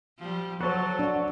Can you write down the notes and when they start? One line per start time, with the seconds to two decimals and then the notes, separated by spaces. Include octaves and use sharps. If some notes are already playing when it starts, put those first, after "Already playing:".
0.19 F3 G3
0.61 F#3 F#4 A4 C5 C#5 C#6
0.99 D4 F#5